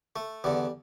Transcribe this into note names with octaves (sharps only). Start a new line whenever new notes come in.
A3
E2 D3 G3